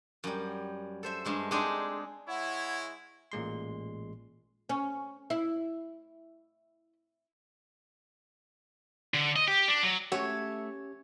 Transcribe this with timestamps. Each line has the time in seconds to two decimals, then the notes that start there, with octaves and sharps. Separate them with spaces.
0.24 F#2 G3
1.03 A4 C5 E5
1.25 G2 G#3 A3
1.51 G#3 C4 D4 D#4 G#4
2.28 G#3 E4 C#5 F#5
3.32 A1 A#2 G#3 C6
4.69 C#4
5.30 E4
9.14 D3
9.36 D#5
9.48 G4
9.68 D4
9.83 F#3
10.12 A3 C#4 F#4 G4 C#5 E5 F#5